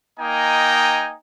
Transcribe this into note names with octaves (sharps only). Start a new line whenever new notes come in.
A#3 D#4 D#5 G5 G#5 A#5